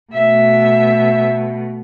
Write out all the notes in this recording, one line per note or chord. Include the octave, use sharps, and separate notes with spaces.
B2 A3 E5